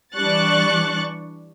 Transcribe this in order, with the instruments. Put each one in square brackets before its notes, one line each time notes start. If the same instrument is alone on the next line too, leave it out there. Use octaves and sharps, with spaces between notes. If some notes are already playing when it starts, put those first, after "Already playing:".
[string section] E3 G3 D4 C#6 F#6 A6